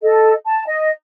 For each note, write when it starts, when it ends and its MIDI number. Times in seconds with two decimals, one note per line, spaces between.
0.02 0.32 69
0.02 0.32 75
0.45 0.64 81
0.67 0.89 75